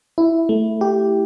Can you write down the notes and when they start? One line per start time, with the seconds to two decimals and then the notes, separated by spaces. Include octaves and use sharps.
0.18 E4
0.49 A3
0.81 G4